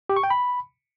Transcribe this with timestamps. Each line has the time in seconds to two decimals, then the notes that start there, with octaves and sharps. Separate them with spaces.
0.09 G4
0.16 C#6
0.23 G5
0.30 B5